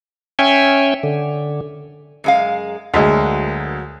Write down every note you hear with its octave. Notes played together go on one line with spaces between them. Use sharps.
C#4 C#5 E5 G5 G#5
D3
F#2 G#3 F5
D2 F#3 G#3 A#3